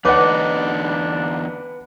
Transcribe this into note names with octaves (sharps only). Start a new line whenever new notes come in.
E2 D3 D4 D#4 B4 C#5 F#5 D6